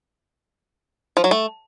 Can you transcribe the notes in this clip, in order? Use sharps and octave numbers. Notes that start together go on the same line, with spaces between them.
F3
F#3
A3